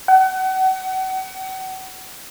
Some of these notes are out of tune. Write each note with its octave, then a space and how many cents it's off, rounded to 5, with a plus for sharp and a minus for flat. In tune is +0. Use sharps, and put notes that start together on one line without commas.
F#5 +35